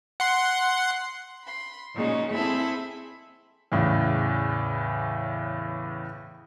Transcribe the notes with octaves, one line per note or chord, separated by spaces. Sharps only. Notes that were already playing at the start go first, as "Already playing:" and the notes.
F#5 C6
B5 C6
A#2 C#3 G#3 C#4 D#4 F#4
C4 E4 G#4 A4 E5 B5
E2 A2 C#3